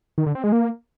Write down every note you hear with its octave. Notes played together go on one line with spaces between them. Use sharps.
D#3
D3
C4
G#3
A#3